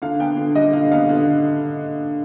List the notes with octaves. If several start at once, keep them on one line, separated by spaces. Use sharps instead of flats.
D3 F5
B3 G5
D3
G3 D#5
D3 F5
B3 F5
D3